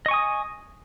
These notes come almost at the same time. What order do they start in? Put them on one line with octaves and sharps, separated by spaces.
D#5 C#6 G#5 D#6